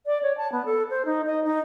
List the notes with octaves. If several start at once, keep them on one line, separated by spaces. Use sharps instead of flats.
D5
C#5
A5
B3
A4
C5
D#4
D#5
D#4